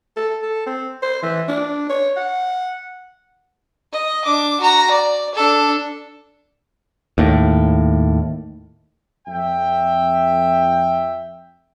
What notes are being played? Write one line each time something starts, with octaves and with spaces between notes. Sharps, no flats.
A4
A4
C4
C5
E3
D4
C#5
F#5
D#5
D4 D6
F#4 A#5
D5
D4 A4
D#2 A2
F2 E5 G5